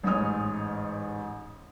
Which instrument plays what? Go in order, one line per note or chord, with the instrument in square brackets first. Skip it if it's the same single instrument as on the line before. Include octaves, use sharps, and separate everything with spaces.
[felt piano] A1 G#2 C#5 G#5 D#6 F6